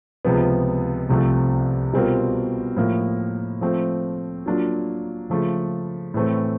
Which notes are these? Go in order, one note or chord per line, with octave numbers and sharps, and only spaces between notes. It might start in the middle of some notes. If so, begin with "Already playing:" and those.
C#2 C3 F3 G#3 B3
C2 C3 F3 A3
B2 G3 C4 F4 A#4
A2 F3 A#3
F3 A3 C4
F#3 A#3 D4 F4
C#3 F3 A3
A2 E3 A3 C4